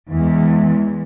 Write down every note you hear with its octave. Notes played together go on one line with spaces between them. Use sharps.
E2 E3 G#3